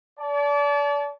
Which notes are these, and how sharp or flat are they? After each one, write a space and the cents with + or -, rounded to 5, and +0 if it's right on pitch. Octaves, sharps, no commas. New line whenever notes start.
D5 -35 A5 -30